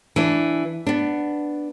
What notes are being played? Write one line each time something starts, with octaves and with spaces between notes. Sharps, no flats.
E3 D4
B3 D4